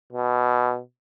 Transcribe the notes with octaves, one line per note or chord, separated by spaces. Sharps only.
B2